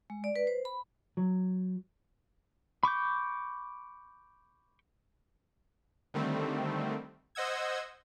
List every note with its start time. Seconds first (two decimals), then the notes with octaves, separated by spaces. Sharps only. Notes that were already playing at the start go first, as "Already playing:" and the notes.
0.10 G#3
0.24 D5
0.36 B4
0.47 C5
0.65 B5
1.17 F#3
2.83 B5 C#6 D6 G6
6.14 D3 D#3 G3 A3 C4
7.35 C5 D#5 F#5 E6 G#6